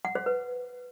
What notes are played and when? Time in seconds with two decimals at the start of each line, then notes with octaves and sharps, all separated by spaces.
0.05 F#5
0.15 C5
0.26 B4